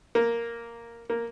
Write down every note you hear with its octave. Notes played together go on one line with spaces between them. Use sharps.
A#3
A#3